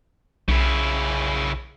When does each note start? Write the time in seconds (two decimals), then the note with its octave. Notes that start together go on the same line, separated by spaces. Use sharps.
0.48 B1 C#3 E4